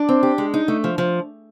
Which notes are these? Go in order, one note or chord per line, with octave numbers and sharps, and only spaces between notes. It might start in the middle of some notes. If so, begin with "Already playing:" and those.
Already playing: D4
C4
G4
G#3
D#4
A3
F3
F3